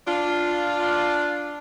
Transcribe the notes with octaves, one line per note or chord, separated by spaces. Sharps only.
D4 F4